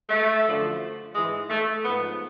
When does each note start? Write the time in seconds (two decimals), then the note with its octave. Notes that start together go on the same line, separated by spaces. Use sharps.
0.10 A3
0.45 F#2 D3 F3
1.15 G#2 E3 G#3
1.50 A3
1.85 G#2 F3 B3